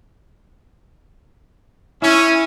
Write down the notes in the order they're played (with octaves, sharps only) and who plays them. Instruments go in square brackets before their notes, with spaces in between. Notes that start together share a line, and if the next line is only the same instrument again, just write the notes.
[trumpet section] C#4 [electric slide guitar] E4